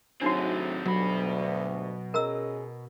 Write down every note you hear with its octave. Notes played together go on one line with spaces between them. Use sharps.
A2 C3 F#3 C4 D4 D#4 F#4 G#4
D2 G2 B2 F#3 B5
C#4 G#4 A#4 D#5 A#5 E6